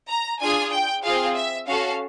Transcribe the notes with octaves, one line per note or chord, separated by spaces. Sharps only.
A#5
D4 F4 G#4 G#5
G5
C4 F4 G#4 F5
E5
C#4 F#4 A4 F5